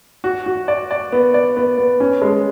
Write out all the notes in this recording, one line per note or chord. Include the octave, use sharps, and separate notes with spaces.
F#4
F#4
D5
D5
B3
D5
B3
B3
C#4
G#3